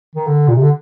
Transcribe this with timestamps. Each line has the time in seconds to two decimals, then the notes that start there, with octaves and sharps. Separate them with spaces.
0.15 D#3
0.27 D3
0.48 A#2
0.56 C3
0.62 D3